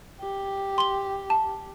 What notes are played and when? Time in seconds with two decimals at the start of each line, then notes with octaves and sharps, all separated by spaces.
0.20 G4
0.78 C6 G7
1.30 A5